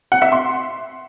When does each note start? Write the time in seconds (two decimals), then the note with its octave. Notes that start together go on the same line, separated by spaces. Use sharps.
0.12 F#5
0.22 E5
0.32 C6